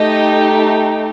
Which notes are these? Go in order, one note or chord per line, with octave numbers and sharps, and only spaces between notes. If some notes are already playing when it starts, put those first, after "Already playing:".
Already playing: A3 D#4 G4 D#5